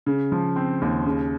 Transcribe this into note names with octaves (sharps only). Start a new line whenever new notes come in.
C#3
F3
C4
D#2
C#3